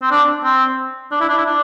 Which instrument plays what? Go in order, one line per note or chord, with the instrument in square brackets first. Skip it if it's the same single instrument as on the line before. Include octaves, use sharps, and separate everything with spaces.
[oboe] C4
D4
C4
D4
E4
D4
E4
D4